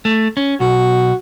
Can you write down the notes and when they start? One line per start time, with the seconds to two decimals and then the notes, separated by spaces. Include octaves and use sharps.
0.05 A3
0.37 C#4
0.60 B1 F#4